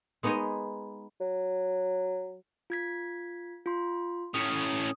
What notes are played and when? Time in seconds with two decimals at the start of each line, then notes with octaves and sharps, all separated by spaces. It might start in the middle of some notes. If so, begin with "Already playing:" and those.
0.23 G#3 B3 D#4 C#5 D#5
1.21 F#3
2.70 F4 G#6 B6
3.66 F4 C6
4.34 A2 C#4 D#6